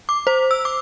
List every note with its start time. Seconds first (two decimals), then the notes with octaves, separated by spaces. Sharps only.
0.09 D6
0.27 C5
0.51 E6
0.65 D6